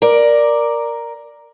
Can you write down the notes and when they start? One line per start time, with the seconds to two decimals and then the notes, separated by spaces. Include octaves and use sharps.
0.02 A#4 D5